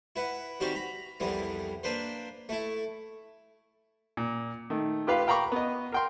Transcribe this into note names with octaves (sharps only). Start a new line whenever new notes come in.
E4 B4 F#5
D#3 G3 C4 F#4 G4
A#5 B5
C2 F2 E3 G3 B3
A#3 D4 B4 C5
A3 E4
A#2
D#3 A3
F4 G4 B4 F5
F5 G5 A#5 B5 C#6 D6
B3 D#5
A#4 G5 C6